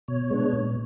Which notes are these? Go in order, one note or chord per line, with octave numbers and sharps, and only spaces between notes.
B2 C#5
G#3 B3 D4
A#2